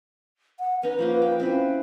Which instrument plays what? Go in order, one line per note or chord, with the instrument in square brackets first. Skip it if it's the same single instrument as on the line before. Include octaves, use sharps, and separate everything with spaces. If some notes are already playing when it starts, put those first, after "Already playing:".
[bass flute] F#5
[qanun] C#4 D#4 A#5 [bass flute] B4
[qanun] F3 A#3 F4
G5
[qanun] C4 E4 B4 [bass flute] C#4